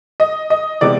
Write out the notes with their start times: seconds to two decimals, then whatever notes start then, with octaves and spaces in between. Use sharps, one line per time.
0.20 D#5
0.50 D#5
0.81 C3 E3 G#3 B3 D5